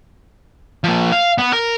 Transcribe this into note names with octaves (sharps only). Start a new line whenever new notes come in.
F3 A#3
F5
B3
A#4